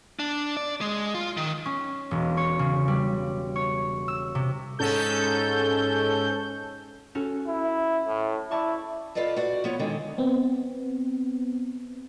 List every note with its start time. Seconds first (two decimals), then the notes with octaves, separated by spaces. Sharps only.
0.19 D4
0.57 D5
0.81 G#3
1.15 F4
1.37 D#3
1.65 C#4
2.11 E1
2.37 C#5
2.59 C#3
2.88 G3
3.56 C#5
4.08 E6
4.35 C3
4.79 G#2 C#4 A4 G6
7.15 C#4 F#4 A4
7.47 E4
8.07 A2
8.51 E4 D5 A5 C#6
9.15 F4 A4 B4 D5 D#5
9.36 F#4 D5
9.64 F3 B3 C#5
9.80 D3 D#3 G#3
10.18 B3 C4